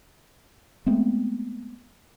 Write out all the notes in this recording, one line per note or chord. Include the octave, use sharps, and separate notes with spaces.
G#3 A3 B3 C4